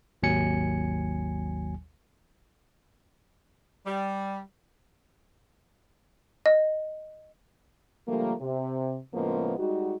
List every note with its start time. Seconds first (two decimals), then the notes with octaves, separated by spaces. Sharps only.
0.23 G#1 D#2 F#3 G#5 C#7
3.86 G3
6.46 D#5
8.07 D3 F3 G3 A3 A#3
8.40 C3
9.13 A2 C#3 F3 G#3 A#3 B3
9.58 G3 G#3 D#4 F#4